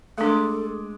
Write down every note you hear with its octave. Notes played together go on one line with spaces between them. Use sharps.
G#3 A3 D4 A4 D6